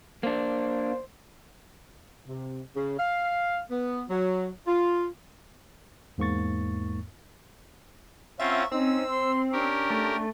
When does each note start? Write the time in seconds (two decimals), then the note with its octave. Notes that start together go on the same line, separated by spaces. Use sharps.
0.23 A#3 D4 C5
2.28 C3
2.76 C#3
2.99 F5
3.71 B3
4.10 F#3
4.67 F4
6.18 E2 G#2 A#3 C#6 A6
8.40 C4 C#4 F4 E5 F#5 A#5 C#6
8.72 C4 C#4 D#4 E6
9.09 C6
9.52 C#4 D4 G4 A#4 C#6
9.90 A3